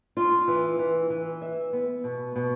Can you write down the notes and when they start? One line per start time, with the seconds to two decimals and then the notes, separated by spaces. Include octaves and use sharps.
0.17 F4
0.48 E3
0.79 E3
1.10 E3
1.42 E5
1.73 B3
2.04 B2
2.36 B2